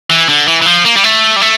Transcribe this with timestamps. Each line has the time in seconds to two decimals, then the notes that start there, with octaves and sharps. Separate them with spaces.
0.10 E3
0.29 D3
0.47 E3
0.62 E3
0.66 F3
0.85 A#3
0.96 G3
1.04 A3
1.36 G3
1.41 A3